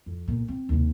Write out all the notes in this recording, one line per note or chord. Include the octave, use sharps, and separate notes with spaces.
F2
B1 A#2
C4
D#2 C3